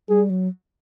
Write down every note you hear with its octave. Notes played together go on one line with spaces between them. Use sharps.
G3 G#4
F#3